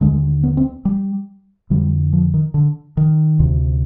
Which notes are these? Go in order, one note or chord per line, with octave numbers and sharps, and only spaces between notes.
D#2 D3 G#3
B3
C4
G3
F2 D3 G3
F3
D#3
D3
D#3
D2 C3